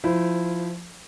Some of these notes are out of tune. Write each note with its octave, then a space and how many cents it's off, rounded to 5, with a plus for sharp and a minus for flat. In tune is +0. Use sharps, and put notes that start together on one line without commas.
F3 +0 E4 +0 C5 -25